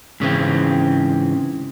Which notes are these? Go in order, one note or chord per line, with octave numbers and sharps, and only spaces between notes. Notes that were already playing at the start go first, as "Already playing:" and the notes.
G#2 C#3 E3 C4